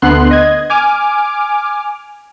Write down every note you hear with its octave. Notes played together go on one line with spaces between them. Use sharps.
D2 D3 B3 C6 F#6
D#5 G#6
G#5 D6 F6